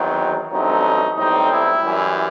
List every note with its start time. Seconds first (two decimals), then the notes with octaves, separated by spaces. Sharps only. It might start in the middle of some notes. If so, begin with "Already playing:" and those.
Already playing: E2 D#3 F#3 C4
0.50 A1 G2 F#3 A3 C4 D#4
1.17 B1 A2 G3 C4 D#4
1.50 E4
1.83 F#2 E3 G3